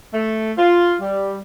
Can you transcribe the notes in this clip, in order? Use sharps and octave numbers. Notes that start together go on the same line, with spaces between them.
A3
F4
G3